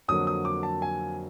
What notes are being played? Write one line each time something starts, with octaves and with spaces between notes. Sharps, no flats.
F2 D3 F#3 A#3 D#6
D#6
D6
A5
G#5